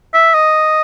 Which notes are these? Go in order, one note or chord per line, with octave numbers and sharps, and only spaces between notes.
E5
D#5